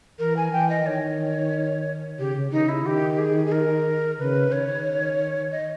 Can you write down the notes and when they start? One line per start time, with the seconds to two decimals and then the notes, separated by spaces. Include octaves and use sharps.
0.18 E3 A#4
0.36 G#5
0.52 E3 G5
0.69 D#5
0.85 D#3 C#5
2.18 C#3 G4
2.36 C#3
2.51 D#3 D#4
2.68 C#3 E4
2.85 D#3 G4
3.18 G#4
3.46 G#4
3.51 A#4
4.18 C#3 B4
4.51 D#3 C#5
5.51 D#5